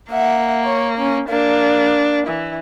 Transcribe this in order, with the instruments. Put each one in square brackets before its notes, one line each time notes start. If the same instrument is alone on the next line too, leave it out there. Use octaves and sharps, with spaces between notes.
[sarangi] A#3 [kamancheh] E5 F#5
[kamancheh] C#5
C#4
[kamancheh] A#3 [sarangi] D4
[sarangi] E3